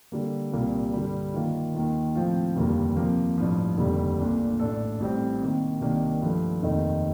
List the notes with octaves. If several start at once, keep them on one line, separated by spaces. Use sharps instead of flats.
D3 G3 A#3
C2 A#2 G3 A#3 F4
G2 D3 G3
D#3 A#3 F4
D#2 D#3 A#3
A2 F3 C4 F4
F1 D#2 D3 G3 A#3
C3 F3 A#3
A1 G2 F3
F1 D#2 D3 G3
A#1 A#2 A3 D4
A1 A2 A3 D4 A4
A1 A2 G3 C4
C3 D#3 A#3
C2 C3 D#3 A#3 D4
G2 F3 A3
F1 D#2 D#3 A3 D#4